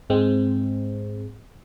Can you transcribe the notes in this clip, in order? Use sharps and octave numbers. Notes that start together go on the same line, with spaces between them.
G#2 G#3 C4